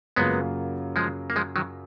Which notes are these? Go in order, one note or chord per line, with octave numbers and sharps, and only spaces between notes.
F#2 C#3 F#3 G#3 A#3 B3 F4
F3 G#3
A#3
F3 G#3
D#3 F#3